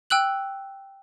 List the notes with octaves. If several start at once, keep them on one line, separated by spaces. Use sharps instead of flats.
G5 E6 F#6 F#7